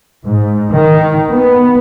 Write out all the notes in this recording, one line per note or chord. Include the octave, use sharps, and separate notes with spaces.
G#2
D#3
B3